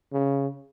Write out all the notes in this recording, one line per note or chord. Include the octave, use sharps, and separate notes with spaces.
C#3